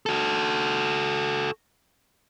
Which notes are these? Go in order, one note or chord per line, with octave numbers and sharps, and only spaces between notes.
F#4 A4